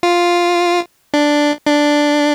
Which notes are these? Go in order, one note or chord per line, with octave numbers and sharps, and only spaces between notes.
F4
D4
D4